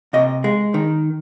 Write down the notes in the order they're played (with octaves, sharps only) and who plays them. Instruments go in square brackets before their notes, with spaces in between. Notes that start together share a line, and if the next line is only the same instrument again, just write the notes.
[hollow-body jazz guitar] C3 D#5
G#3
D#3